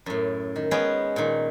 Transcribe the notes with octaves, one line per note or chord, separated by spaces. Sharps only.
F#2 A2
D#3
G#3 B3 C#4 G#4 G5
A#2 D#3